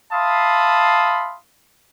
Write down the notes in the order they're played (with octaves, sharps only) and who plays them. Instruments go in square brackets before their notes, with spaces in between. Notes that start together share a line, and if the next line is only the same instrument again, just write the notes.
[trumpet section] E5 F5 A5 B5 C6 D#6